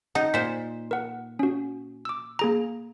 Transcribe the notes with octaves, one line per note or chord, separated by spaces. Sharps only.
D#4 F#5
A#2 C5 B6
A#4 F#5
C#4 F#4
D6 E6
A#3 G#4 A#5